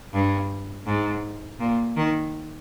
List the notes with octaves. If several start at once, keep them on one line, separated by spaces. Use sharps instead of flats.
G2
G#2
A#2
D#3